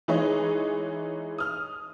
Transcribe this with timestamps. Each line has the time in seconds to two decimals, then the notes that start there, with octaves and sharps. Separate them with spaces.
0.08 E3 G#3 D#4 G#4 C#5 D#5
1.38 D#6 F6